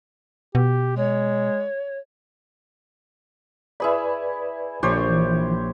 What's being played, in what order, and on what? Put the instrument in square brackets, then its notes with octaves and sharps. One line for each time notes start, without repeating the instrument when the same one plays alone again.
[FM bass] B2 [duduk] G4
[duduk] G#3 [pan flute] C#5
[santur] E4 G#4 B5 [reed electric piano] B4 D5
[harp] A#1 [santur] G4 C5 C#5
[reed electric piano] E3